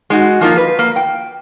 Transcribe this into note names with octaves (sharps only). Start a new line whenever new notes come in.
G#3 D#4 F#4
F3 A#3 D#4 F4
B4
A#3
G5